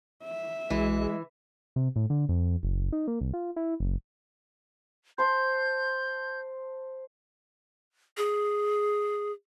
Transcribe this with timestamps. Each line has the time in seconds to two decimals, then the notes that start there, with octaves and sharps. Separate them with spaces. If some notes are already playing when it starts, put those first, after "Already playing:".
0.24 E5
0.70 B1 E3 G#3 F#4
1.76 C3
1.96 A2
2.10 D3
2.29 F2
2.63 F#1
2.92 D#4
3.07 A#3
3.21 C2
3.34 F4
3.56 E4
3.80 F#1
5.18 C5 A5 C6 G6
8.17 G#4